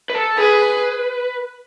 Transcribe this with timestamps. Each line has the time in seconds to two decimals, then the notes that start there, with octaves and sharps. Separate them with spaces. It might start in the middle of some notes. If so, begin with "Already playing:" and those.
0.10 B4
0.14 A4
0.38 G#4 B4